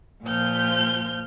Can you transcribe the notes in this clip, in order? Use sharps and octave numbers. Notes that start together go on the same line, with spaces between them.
A#2 F3 F6 G6